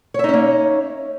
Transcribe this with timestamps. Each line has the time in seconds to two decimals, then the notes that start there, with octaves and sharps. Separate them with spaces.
0.14 C#5
0.19 E5
0.24 D#4
0.29 C#4
0.33 A#3